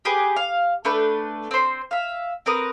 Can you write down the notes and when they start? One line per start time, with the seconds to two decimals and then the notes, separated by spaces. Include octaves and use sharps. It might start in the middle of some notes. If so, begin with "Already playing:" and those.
0.05 G4 G#4 B4
0.36 F5
0.85 A3 D4 B4 G6
1.51 C4 C5
1.91 E5 F5
2.46 C4 A#4 B4 D#6